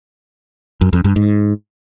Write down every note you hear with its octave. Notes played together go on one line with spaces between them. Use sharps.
F#2
F2
G2
G#2